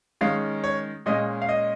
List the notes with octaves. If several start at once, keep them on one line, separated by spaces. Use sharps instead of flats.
D#3 G#3 C#4 F5
C#5
A#2 G#3 C#4 D#5
F5
D#5